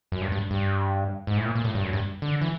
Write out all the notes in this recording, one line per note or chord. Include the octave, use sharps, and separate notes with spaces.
F#2
G2
G2
G2
G#2
A2
A#2
A#2
A2
G2
F#2
G2
D3
E3